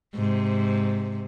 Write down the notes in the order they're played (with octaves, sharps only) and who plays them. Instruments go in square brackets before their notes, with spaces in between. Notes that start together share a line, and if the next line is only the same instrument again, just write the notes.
[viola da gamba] G#2 C3